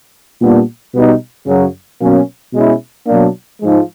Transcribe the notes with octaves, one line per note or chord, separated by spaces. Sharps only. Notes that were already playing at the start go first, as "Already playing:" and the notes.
A#2 G3 B3 D4
B2 G3 B3 D#4
F#2 C#3 F#3
B2 F#3 A#3 C#4
B2 G#3 C#4 E4
B2 F#3 A#3 D4
G#2 F3 G#3